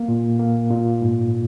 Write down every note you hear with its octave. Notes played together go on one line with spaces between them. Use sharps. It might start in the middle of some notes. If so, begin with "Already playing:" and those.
Already playing: A#3
A#2
A#3
A#2
G#2